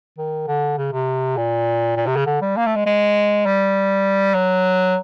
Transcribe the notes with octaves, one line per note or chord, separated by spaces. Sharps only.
D#3
D3
C#3
C3
A#2
A#2
C3
C#3
D3
G3
A#3
A3
G#3
G#3
G3
F#3